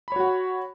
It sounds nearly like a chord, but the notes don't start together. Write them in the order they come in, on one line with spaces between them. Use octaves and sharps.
B5 C#5 F#4 F#5